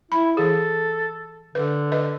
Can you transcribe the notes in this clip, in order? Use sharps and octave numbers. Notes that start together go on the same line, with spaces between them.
E4 B5
E3 G#4 A4
D3 B4
B4 D#5